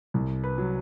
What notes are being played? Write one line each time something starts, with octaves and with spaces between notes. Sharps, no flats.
C2
B4
F#3